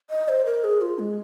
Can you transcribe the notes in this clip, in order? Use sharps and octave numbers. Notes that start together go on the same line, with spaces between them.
D#5
C5
A#4
G#4
F4
G#3